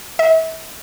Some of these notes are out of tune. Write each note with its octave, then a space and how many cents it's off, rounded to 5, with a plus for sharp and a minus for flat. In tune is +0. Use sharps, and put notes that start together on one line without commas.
E5 -35